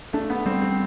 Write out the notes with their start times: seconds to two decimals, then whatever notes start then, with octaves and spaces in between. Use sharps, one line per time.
0.13 A3 D4
0.30 B3
0.46 G3 C4
0.62 C4